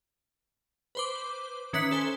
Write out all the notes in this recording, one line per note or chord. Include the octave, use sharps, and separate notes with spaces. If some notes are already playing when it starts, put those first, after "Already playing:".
B4 C5 D6
D#3 C#4 B4 E5 F#6 B6
A4 C5 G#5